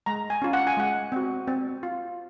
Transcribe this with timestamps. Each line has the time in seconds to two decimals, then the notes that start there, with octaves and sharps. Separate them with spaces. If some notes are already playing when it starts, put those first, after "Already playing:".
0.06 G#3 A#5
0.30 G#5
0.42 C#4 F4
0.53 F#5
0.67 G#5
0.77 G#3 F#5
1.12 C4 F#4
1.48 C4
1.83 F4